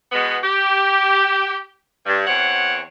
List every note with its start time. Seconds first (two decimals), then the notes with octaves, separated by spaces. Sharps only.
0.12 B2 G#3 B3
0.42 G4
2.06 G2
2.26 E2 C4 C#5 F#5